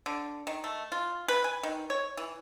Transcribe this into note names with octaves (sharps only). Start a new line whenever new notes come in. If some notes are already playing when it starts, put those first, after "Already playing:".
D3
D#3
A3
F4
B4
G#5
D#3
C#5
E3